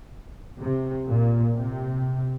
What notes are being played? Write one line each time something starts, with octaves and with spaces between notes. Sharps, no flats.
C3
A#2
C3